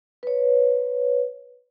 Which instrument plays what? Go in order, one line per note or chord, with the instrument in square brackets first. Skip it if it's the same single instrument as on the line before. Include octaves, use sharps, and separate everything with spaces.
[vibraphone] B4 C#5